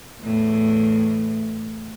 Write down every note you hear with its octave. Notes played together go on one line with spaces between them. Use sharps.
E2 A2